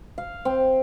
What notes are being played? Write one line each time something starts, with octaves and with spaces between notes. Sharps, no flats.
F5
C4